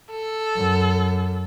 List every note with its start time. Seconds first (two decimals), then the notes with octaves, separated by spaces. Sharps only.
0.11 A4
0.56 F#2